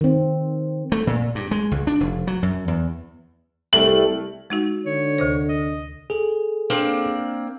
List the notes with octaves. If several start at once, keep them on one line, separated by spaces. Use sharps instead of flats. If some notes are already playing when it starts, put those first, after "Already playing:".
D#3 C4
A3
A#2
G2
G#3
C#2
D4
F1
F#3
F#2
E2
C2 G3 A3 F#7
G#3 D#4 F#4
D3 C#5
D2 C3 C5
D#5
G#4 A4
A#3 C4 D4